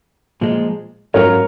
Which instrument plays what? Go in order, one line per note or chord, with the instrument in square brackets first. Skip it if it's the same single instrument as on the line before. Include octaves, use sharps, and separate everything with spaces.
[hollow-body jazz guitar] A#2 F3 G#3
[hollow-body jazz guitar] G#2 F#3 C#4 F4 [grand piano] A#4 C#5